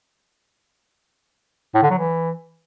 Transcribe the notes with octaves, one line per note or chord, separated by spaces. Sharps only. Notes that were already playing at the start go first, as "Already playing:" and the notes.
A2
D3
F#3
E3